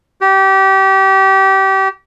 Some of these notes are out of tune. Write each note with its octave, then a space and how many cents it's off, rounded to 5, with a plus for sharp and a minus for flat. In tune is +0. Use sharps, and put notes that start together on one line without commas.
G4 -25